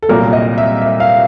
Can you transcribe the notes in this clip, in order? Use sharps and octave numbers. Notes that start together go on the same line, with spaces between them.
A4
C2 A#2 F#3 A#3 A#4
D#5
E5
E5
F5